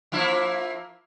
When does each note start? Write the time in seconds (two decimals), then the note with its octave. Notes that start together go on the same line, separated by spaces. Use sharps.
0.12 F3 A#3 E4